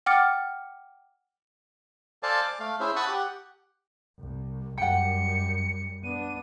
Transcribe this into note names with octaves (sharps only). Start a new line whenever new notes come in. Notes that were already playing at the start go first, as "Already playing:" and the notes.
F#5 G5 D6 F6 A6 C#7
A4 C5 D5 F5 G#5 A5
D6
A3 F5
C#4 E4 G#4 C5 E5
F#5 A5 B5 C#6 D#6 E6
G4 F#5
C2
F#2 G3 F#5 G5 C#7
B3 D4 D#7